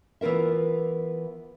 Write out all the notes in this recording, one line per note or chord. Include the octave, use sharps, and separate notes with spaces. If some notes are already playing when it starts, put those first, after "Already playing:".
E3 B3 F4 A#4 E5